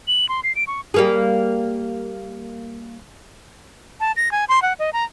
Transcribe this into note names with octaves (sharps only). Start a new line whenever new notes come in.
F#7
C6
C7
D7
C#6
G3 A#3 G#4
A5
A#6
G#5
C6
F#5
D#5
A#5